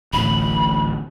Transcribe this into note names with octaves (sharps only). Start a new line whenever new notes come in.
D1 A1 B5